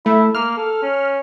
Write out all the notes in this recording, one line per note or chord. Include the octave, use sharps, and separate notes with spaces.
A3 E4
A#3 F6
A4
C#4